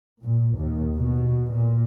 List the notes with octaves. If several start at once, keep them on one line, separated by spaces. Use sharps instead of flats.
A#2
D#2
B2
A#2